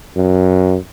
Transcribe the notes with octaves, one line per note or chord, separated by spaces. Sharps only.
F#2